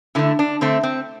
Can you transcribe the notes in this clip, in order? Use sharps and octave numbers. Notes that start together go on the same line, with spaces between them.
D3 A3 E4
D4
D3 A3 C4
C4